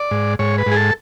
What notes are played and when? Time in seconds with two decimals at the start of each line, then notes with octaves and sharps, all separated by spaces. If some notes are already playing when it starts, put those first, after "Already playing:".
Already playing: D5
0.11 G#2
0.39 G#2 C#5
0.58 B4
0.67 G#2 G#4
0.76 A4